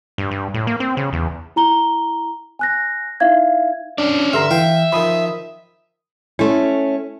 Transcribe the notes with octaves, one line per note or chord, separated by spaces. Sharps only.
G2
G2
A2
A#3
C4
C#3
E2
E4 A#5 G7
G#5 F#6 A#6
D#4 E4 E5 F5 G#6
C#4 D4 D5
G2 D3 E5 A#5 C6 F6
E3 F5 G5
D#3 F3 B5 D#6
A3 C#4 E4